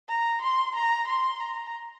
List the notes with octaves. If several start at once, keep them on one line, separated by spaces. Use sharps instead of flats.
A#5
C6
A#5
C6
A#5